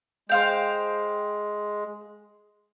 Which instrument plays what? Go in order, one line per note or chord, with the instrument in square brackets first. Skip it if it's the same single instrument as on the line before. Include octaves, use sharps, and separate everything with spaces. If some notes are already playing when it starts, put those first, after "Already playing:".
[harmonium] G#3 [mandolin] C5 F5 G5